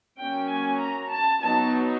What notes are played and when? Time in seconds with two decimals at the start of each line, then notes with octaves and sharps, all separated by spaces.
0.21 F#3 A#3 C#4 G5
0.51 G#5
0.82 A#5
1.12 A5
1.42 F#3 B3 D#4 A5